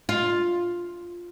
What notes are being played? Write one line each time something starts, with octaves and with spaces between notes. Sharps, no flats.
F4